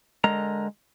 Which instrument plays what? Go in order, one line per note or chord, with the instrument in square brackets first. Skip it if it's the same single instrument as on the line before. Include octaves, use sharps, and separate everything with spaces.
[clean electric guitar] D3 G#3 A#4 A#5